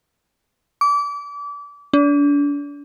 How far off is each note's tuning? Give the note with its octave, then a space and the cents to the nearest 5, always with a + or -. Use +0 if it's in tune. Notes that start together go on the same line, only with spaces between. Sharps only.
D6 -30
D4 -35